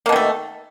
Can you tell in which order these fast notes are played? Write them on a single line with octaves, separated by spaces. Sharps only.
A#3 B2 D#3 A3